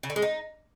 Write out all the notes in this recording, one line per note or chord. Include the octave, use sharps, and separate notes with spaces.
C#3
D3
G#3
D#4